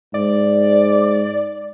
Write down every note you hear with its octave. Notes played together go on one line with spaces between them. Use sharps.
G#2 D5